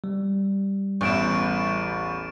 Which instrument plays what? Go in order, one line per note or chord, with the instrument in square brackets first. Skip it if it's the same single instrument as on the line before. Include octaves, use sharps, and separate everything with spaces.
[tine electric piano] G3
[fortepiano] A1 E2 E4 [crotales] C#6 D7 E7